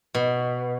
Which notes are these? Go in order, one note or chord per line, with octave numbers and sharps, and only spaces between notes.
B2